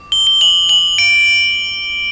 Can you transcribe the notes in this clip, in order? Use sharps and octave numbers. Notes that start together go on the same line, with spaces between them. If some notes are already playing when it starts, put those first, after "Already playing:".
Already playing: D6
G7
G7
F#7
F#7
D7